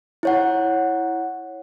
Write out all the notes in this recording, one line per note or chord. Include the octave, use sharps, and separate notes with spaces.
E4 C#5 F#5